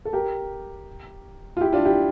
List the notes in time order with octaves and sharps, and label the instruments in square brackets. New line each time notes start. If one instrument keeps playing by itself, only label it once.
[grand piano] A4
G4 A#4
F4
E4 G4
D4 F4
E4 G4